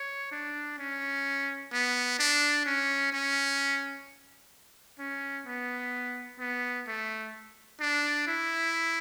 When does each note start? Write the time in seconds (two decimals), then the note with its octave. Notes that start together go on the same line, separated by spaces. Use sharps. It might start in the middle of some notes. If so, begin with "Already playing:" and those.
Already playing: C#5
0.32 D4
0.79 C#4
1.72 B3
2.19 D4
2.66 C#4
3.12 C#4
4.99 C#4
5.46 B3
6.40 B3
6.87 A3
7.80 D4
8.27 E4